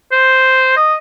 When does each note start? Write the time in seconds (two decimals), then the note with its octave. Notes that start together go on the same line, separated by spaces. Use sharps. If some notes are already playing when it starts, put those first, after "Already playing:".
0.12 C5
0.77 D#5